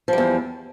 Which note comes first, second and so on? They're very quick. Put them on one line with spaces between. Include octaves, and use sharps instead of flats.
F3 G3 E2